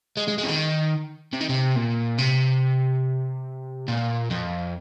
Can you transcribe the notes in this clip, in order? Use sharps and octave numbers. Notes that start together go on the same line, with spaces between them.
G#3
G#3
G#3
C3
D#3
C3
D#3
C3
A#2
C3
A#2
F2